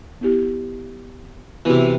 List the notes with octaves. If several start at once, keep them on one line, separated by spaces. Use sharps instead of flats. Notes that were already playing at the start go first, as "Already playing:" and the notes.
B3 E4 G4
C3 E3 B3 F#4